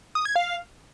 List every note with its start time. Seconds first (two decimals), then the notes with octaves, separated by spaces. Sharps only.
0.15 D#6
0.25 G#6
0.36 F5